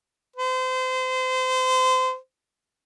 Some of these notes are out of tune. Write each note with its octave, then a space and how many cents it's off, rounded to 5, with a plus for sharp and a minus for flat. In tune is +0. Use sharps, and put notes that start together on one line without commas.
C5 -30